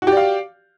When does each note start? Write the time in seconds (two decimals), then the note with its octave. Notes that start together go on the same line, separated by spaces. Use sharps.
0.02 F#4
0.07 G4
0.12 D5
0.17 F5